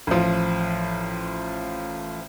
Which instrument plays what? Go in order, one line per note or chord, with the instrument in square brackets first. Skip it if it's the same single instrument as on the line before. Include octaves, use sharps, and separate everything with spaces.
[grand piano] A1 F3